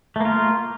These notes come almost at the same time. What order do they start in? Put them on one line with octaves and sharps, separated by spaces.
A3 A#3 F4